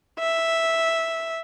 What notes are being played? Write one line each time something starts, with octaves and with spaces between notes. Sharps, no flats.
E5